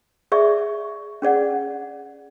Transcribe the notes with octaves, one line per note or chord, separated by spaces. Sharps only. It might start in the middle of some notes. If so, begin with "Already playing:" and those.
G#4 D5 E5 C#6
C#4 G#4 D5 F#5